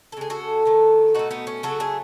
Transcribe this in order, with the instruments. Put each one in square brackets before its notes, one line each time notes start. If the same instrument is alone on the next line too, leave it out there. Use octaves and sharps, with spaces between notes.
[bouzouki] A4
C#3 G#3 G#4
F#4 A4
D#3 F#3 A3
B2 A3 D#4 F#4
B3 D#4
C#4
C#3 F#3 A3 F#4 A4
E4 G#4